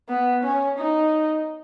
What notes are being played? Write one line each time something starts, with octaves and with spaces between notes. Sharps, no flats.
B3
C#4
D#4